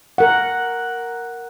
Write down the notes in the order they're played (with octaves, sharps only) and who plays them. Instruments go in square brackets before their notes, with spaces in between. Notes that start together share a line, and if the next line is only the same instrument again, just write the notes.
[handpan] A#4 F#5